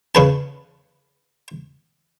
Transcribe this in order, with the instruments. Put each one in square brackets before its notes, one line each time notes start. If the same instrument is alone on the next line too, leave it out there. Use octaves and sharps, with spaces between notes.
[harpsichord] C#3 B4 A5